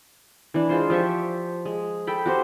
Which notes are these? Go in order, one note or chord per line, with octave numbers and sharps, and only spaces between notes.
E3 D4
G#3 F4 C5
F3 G4 E5 C#6
G#3
A4 G5 B5
F#4 G4 C5